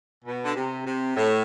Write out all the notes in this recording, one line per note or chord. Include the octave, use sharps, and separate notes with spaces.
B2
D3
C3
C3
A2